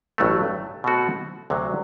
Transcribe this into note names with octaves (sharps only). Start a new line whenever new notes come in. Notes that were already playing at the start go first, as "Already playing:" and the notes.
A1 G2 F#3 A3
B2 A3 C4 F#4 A4
D2 C3 F#3